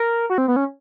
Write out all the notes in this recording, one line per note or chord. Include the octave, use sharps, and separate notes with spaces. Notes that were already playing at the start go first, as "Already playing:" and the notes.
Already playing: A#4
F#4
C4
B3
C#4